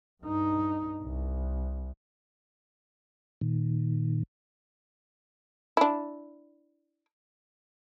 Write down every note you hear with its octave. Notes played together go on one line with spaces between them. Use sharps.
G2 D#4
C2
A#2 D#3
D4 E4